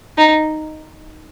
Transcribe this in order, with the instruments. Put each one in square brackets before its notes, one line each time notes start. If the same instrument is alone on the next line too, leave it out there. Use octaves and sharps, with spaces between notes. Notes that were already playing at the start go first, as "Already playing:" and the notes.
[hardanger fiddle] D#4